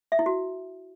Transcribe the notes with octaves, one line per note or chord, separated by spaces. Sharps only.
E5
E4
F#4